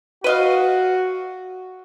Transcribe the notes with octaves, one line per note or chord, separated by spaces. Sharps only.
F#4 B4 D#5 F5